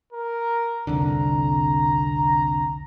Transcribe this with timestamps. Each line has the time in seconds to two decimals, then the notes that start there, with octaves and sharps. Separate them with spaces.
0.13 A#4
0.87 C2 F2 D3 A#5